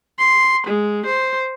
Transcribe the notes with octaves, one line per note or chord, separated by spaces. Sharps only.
C6
G#3
C5